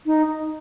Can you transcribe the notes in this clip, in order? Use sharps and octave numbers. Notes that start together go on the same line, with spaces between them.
D#4